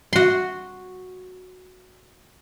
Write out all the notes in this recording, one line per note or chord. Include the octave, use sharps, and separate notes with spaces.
F#4 C6